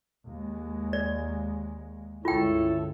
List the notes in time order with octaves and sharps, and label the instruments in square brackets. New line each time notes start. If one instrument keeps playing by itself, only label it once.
[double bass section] D#2 G#3
[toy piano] D5
[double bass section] C#2 G2 D3 [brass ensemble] E4 A4 C#5 [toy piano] F4 G5